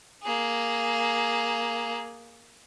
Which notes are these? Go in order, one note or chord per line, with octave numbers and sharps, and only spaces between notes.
A#3 G#4